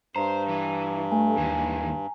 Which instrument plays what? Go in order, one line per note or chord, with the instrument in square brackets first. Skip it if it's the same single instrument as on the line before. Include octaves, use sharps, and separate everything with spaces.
[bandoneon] G2 [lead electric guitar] C5 [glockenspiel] A#5
[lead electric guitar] E3
[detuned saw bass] A3 [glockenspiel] G#5
[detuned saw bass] D#2 [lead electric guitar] E3 G#3